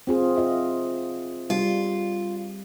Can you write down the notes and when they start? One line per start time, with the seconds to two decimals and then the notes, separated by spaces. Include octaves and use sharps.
0.07 C4 F4 G#4
0.36 F4 D#5 E5
1.50 G3 F4